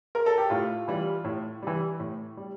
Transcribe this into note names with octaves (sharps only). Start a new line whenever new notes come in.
A#4
A4
G4
A2 F4
E3 G3
A2
E3 G3
A2
G3